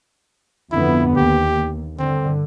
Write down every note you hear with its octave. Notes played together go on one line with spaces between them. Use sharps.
F2 D3 B3 E4
D#2 G4
G2 D3 C4